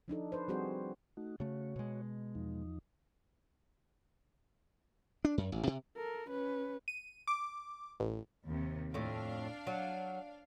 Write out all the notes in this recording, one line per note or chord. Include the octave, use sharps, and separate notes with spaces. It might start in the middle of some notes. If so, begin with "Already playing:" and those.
F3 D4 D#4 A4
B4 C5
F3 G3 C4 F#4 G#4 C5
A3 D#4 F#4
C#3 A3 F#4 C#5
B2 G#3
E2 F3 D#4
D4
F#2
A1
C3
A4 A#4
C#4 B4
D#7
D6
A1
D#2 C3
F2 A2 D4 F5
F#3